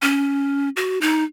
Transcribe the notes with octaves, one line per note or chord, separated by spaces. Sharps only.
C#4
F#4
D#4